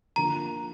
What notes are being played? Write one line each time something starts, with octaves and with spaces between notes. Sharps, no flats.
D3 F3 A#3 F4 A#5